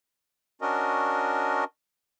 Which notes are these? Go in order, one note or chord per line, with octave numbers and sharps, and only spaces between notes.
C#4 D4 F#4 A#4 D#5